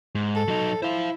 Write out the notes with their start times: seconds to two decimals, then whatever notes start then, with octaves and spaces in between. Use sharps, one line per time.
0.15 G#2
0.36 A4
0.48 F#3 D#4
0.82 E4 C5 F5